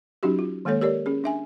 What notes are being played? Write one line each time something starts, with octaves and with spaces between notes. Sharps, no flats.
F#3 C#4 D#4 F#4 G4
F4
D#3 G#3 A#3 A4 C#5
G4 A#4 C#5 D5
C#4 G#4
D4 E5 G#5